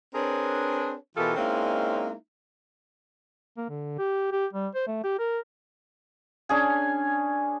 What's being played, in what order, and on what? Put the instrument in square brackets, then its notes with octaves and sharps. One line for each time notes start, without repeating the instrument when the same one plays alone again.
[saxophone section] C4 D4 G#4 A#4 B4 C#5
B2 E3 F4 G4 A4 A#4
G#3 A#3 C4 C#4 D#4 E4
[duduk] A#3
D3
G4
G4
G3
C5
A3
G4
A#4
[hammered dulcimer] C#4 D4 G#4 G#5